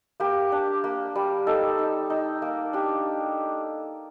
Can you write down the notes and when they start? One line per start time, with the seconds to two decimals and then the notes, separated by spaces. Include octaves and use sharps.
0.20 A#3 G4
0.52 D4
0.84 A#3
1.16 G3
1.47 D#4 A4
1.78 D#4
2.10 D#4
2.42 A#3
2.73 D4 G4